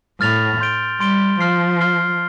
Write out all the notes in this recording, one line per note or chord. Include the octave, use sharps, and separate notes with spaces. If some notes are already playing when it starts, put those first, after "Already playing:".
A2 F6 A6 F7
C6 G6 D7 G7
G3 C6 A6 D7 G7
F3 C6 F6 C7
F6 C7 G7